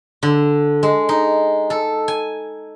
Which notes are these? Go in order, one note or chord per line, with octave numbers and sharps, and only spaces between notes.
D3
G#3
D#4
A4
G#5